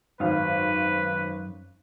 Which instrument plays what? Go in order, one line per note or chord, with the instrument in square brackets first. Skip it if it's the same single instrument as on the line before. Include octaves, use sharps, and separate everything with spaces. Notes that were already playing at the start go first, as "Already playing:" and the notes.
[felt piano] G#1 [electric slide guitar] F#2 F5 [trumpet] B4